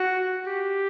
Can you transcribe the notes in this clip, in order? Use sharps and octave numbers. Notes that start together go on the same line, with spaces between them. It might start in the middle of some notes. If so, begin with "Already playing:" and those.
Already playing: F#4
G4